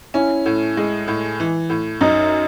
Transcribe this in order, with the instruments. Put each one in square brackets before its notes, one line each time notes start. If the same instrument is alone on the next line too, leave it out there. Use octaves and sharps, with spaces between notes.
[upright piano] C#4 [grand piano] E4
[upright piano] A2
G#3
A2
E3
A2
[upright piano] F#2 [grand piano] D#4